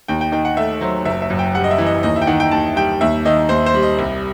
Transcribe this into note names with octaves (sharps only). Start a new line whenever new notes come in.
D#2 G5
G5
D#3 G5
F#5
A3 E5
F#3 C5
F#1 E5
E5
F#2
G5
G3 F#5
D#5
E5
E3
D#5
D#2 D#5
E5
G5
D#3 F#5
G5
D#2 A5
G3 G5
D#2 E5
D#3 D#5
D#2 C5
C5
G3
D#5
C2